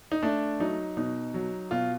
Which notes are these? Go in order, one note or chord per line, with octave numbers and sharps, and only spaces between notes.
D#4
A3 D4
F#3 D#4
B2 D#4
F#3
B2 F4